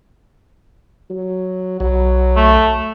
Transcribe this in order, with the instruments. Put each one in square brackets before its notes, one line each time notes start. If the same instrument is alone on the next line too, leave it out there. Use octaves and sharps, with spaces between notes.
[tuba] F#3
[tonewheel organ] B1 [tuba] F#3
[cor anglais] A3